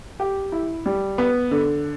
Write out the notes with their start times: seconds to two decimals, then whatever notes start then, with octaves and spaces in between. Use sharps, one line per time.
0.20 G4
0.52 E4
0.86 G3
1.18 B3
1.51 D3